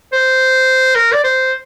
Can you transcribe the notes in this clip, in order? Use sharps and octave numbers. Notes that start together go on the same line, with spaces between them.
C5
A#4
D5
C5